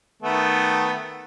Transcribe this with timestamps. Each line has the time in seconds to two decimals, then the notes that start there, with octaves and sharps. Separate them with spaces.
0.22 D#3 A3 B3